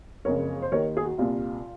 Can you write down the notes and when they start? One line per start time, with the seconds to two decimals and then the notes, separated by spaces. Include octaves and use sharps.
0.25 F#1 F2 C#3 A#4 C#5
0.62 C5
0.72 D#2 D#3 A#4 C#5
0.97 G#4
1.03 F#4
1.18 C2 A#2 F4